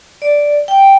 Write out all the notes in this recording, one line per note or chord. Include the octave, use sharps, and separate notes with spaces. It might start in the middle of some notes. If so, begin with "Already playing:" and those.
D5
G5